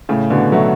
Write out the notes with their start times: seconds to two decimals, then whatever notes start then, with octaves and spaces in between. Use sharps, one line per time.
0.09 A2 C#3
0.30 B2 D3
0.52 F#3 A3